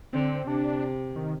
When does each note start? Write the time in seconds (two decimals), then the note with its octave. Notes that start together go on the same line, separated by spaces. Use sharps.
0.13 D3 C4
0.47 C3 D4
1.16 D#3